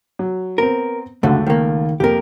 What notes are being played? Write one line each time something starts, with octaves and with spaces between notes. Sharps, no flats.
F#3
B3 C4 A#4
C#2 F#2 D3 A3
D#3 A#3
F2 A#3 G4 A#4